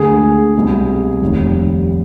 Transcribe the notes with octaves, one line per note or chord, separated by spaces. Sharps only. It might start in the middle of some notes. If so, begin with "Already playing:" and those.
Already playing: D2 D3 G#3 G#4
C2 B2 G#3
F1 D#2 D#3 G3